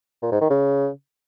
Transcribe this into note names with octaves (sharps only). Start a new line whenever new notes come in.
A#2
G#2
D#3
C#3